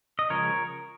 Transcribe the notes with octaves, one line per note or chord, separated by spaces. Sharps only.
D#5
C#3 F3 G#3 A#4 C#5